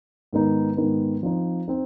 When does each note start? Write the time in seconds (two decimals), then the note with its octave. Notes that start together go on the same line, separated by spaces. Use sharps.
0.33 G#2 D#3 B3 D#4
0.77 G#2 D#3 B3 D#4
1.23 F3 C4 D#4
1.68 C4 D#4